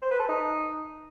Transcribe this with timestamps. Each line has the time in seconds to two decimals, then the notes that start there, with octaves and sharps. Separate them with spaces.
0.02 C5
0.11 B4
0.19 A4
0.28 D#4